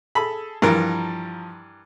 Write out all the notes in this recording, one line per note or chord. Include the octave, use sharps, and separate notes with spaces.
G#4 A4 A5 B5
G2 E3 F3 A#4 A5 A#5